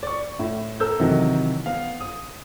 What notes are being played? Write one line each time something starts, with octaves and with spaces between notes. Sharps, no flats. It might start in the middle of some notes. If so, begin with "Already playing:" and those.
D5 C#6
A2
A4 A#4 E6 G6
C3 D#3 E3 F#3 D#4
B3 F5
D#6